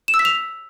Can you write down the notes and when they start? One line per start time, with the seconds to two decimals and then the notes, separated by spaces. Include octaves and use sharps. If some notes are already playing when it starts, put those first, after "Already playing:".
0.08 E7
0.14 E6
0.19 B6
0.25 F7